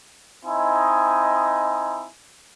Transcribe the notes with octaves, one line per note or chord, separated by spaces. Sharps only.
C4 D#4 E4 D#5 G#5